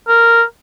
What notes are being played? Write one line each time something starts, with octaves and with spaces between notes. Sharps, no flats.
A#4